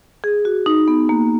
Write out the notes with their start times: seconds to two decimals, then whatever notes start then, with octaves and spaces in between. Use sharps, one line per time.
0.24 G#4
0.45 F#4
0.66 D#4
0.88 B3
1.09 A#3